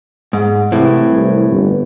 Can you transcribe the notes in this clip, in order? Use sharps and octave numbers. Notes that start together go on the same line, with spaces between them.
G#2
A2 C3 E3
C2
G1